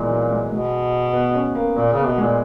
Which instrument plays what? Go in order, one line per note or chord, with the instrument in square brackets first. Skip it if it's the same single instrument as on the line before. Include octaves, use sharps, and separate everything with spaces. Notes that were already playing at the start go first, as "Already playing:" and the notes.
Already playing: [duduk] A#2 [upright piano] E3 G#3 A#3 B3
[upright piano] F#3
G#3
[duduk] B2 [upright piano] G#3
[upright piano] B3
C#4
A#3
[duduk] A#2 [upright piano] A#3
[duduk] C#3 [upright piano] B3
[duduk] B2
[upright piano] G#3
[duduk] A#2